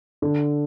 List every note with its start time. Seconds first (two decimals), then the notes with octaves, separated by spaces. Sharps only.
0.22 D3